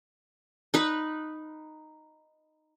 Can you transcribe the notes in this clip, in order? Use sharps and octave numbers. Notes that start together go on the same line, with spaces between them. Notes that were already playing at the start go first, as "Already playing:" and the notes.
D#4 B4